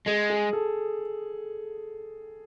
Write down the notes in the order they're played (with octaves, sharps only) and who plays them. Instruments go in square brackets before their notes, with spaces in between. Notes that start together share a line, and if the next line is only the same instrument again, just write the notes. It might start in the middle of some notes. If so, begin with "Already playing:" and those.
[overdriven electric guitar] G#3 [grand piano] G#4
[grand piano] G#4
A4